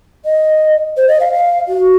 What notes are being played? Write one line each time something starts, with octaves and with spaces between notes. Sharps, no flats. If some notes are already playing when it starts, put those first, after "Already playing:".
D#5
C5
D#5
F5
F5
F#4